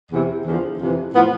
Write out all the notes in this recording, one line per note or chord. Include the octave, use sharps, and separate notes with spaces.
E2 C3 E3
E2 D3 F3
F2 C3 E3
A2 F3 B3